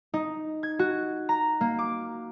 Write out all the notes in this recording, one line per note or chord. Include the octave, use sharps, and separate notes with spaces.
D#4
G#6
F#4
A#5
A#3
D6